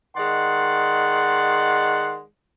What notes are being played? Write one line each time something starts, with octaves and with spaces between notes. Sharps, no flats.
D#3 G#3 D5 F#5 C6